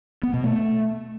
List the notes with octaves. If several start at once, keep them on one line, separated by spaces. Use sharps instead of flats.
B3
B2
A3